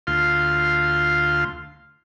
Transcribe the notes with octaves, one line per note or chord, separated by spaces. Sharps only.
D2 F4 F5 C6